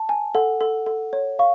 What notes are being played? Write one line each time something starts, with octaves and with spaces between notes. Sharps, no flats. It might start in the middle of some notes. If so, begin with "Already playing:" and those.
Already playing: A5
G#5
A4 F#5
A4
A4
C#5
F5 C#6